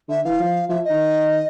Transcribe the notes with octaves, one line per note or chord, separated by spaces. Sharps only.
D3 E5
E3 F5
F3
F3 E5
D#5
D#3